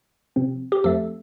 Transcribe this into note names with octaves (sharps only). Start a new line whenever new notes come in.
C3 F3 C4
G4
F2 F3 A3 A4